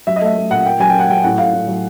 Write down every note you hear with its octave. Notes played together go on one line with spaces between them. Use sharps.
F#3 E5
D#5
A3 E5
A3
A#2 F#5
A#3 G5
F#3 G#5
G5
A#3 F#5
F#3 G5
A2 F#5
A2 F5
A2
F#3